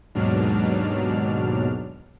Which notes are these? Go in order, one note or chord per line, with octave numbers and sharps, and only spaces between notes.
D#2 G#2 B2 F#3 D4 F6